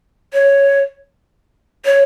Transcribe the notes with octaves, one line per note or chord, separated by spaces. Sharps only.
C#5
C#5